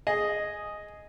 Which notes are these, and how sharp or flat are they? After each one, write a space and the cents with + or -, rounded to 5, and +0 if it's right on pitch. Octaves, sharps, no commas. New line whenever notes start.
G#4 +0 D#5 +0